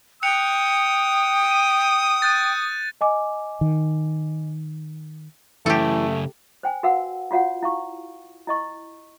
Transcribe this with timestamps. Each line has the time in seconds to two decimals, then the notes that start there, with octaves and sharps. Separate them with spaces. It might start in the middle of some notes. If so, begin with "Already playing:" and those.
0.23 G5 D#6 F#6 C#7 F7
1.51 D#7
2.22 F#6 G6 A6
3.01 D#5 G#5 D6
3.61 D#3
5.66 F#2 C#3 E3 A3 G4 A4
6.63 C5 G5 G#5
6.83 F#4 A#4 B4 F5 F#5 E6
7.31 F4 F#4 C#5 F5 F#5
7.63 E4 F5 C#6
8.47 E4 D#5 C#6